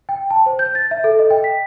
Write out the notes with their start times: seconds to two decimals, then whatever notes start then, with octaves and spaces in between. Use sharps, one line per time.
0.09 G5
0.30 A5
0.46 C5
0.59 G6
0.75 A6
0.91 E5
1.04 A4
1.19 D#5
1.30 G5
1.44 B6